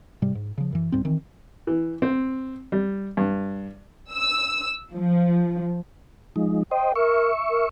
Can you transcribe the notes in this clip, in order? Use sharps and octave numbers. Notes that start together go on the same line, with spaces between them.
G#2 C3 G3
G#2
C#3 F3
F#2 E3
C#2 G#2 G3 C4
D#3 E3 C4
E3
C4
G3
G2
E6
F3
F3 G#3 D#4
C5 D#5 G5
A#4 E5 C#6
A#4